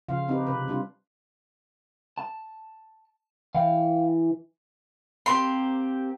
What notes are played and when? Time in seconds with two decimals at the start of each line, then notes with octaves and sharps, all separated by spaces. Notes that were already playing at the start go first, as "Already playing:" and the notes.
0.09 C#3 F3 F4 F5
0.28 C4 D#4 G4 B4
0.47 C3 B4
0.68 G3 D4 F4
2.18 A5
3.55 E3 F5 G5
5.26 A#3 C4 G4 C6